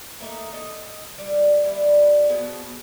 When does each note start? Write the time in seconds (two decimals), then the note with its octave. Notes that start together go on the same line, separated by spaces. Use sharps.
0.21 A3 A#3 D#4 A4
0.53 A4 D#5
1.18 G3
1.64 G3 E4
2.29 B2 F3 B3 G#4